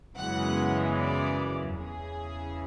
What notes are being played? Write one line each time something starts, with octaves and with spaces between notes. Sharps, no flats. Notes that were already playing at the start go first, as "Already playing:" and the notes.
F#2 C#3 E3 G#3 B3 F#5
D5
E2 C#3 E3 G#4